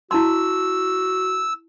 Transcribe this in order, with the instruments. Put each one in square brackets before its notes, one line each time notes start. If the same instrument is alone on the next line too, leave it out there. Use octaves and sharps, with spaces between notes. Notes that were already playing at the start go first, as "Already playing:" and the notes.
[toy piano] E4 A5 C6 [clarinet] F#4 [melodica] E6